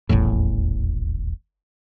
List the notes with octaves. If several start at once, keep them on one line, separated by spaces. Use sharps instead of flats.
D#1 A1 E2 A2